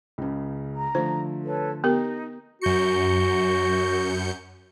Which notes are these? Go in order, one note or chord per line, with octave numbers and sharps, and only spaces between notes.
C#2 C#3
A#5
D3 F3 A3 C5
A4 B4 C#5
B3 D#4 G4 A#4
F#2 F#4 G6 C#7